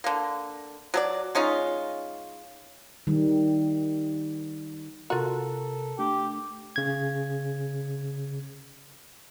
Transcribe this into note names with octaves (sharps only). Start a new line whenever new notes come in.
D3 A#3
F#3 A4 D5
G#3 C#4 D#4 F4
D#3 G3
C3 F4 F#4 A4 A#4 A#5
A3 D4 G4
C#3 G#6